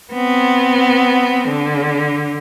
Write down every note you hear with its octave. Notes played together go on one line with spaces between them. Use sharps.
B3 C4
D3